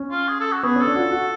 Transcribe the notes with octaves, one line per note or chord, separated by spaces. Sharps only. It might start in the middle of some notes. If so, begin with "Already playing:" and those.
Already playing: C#4
F4
G#4
A4
F#4
B3 G#4
C#4
A4
D4
F#4
F4
F#4